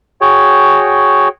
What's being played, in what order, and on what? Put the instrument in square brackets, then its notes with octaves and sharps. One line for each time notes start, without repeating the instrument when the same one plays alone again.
[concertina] F#4 G#4 C#5 G5